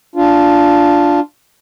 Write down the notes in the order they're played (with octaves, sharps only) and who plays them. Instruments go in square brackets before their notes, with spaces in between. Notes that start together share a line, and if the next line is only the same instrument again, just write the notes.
[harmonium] D4 F4